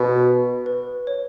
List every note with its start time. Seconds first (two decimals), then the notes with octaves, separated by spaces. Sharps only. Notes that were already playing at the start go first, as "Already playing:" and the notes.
Already playing: B2 B4
0.66 B4
1.07 C#5